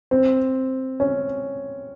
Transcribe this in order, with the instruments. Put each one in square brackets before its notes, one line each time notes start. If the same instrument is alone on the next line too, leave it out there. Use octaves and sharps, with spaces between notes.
[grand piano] C4
C#4